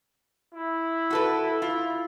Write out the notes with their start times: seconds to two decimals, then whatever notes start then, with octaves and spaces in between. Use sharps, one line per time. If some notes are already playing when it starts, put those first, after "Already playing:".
0.54 E4
1.10 F#4 A4 B4
1.62 F4